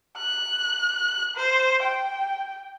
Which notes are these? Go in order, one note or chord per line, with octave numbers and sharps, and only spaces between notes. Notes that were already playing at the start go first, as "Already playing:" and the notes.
F#6
C5
G5